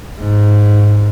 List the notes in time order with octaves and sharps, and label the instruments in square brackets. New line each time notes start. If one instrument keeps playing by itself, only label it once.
[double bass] G#2